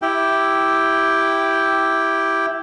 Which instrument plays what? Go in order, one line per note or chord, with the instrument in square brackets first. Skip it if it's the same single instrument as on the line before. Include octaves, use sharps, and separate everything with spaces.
[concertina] E4 G4 G5